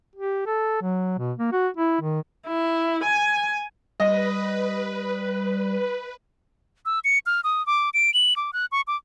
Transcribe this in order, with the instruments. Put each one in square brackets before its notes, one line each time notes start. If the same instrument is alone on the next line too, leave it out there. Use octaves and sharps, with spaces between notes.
[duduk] G4
A4
F#3
B2
A#3
F#4
E4
D#3
[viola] E4
G#5
[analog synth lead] G3 [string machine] B4 [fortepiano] D#5
[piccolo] E6
C#7
F6
D#6
D6
D7
F#7
D6
F#6
C#6
D6